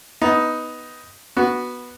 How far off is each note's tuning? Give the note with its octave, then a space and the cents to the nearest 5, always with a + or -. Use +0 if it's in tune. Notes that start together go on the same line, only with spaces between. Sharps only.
B3 +0 D#4 +10
B3 -10 F#4 +0